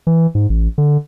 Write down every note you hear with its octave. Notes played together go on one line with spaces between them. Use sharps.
E3
G#2
A1
D3